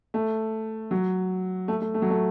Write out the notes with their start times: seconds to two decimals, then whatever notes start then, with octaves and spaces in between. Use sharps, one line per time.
0.14 A3
0.91 F#3
1.68 A3
1.81 A3
1.94 A3
2.02 F#3
2.10 A3